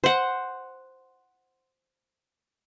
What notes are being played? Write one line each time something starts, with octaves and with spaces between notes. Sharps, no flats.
C5 F#5